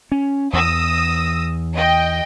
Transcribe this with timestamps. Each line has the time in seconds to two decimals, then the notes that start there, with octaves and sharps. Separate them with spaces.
0.12 C#4
0.53 E2 D#6 E6 A#6
1.75 D#5 G5